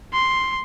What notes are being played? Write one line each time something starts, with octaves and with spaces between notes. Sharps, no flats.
C6